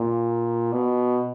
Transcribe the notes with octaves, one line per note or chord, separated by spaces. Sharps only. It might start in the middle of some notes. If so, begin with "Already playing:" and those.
Already playing: A#2
B2